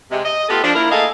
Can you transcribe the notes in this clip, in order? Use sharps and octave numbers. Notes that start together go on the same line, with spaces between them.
C3 G#3
D#5
A3 B3 F4 G4 A4
F3 D4
A#3 E4 A#4
A3 A#3 G#4 A4 D#5 F5